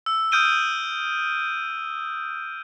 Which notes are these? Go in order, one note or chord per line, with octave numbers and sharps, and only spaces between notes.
E6
D#6 F6 G6 D7 D#7 G7